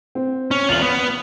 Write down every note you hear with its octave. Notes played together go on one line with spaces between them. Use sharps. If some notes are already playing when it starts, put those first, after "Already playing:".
C4
C#4
E2 F4 F7 F#7
B3